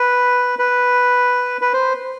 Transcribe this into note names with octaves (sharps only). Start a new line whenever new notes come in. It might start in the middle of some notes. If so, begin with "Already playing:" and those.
Already playing: B4
B4
B4
C5